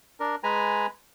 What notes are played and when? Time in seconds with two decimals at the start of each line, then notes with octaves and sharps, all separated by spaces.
0.20 D4 A#4
0.43 G#3 B4 G#5 A#5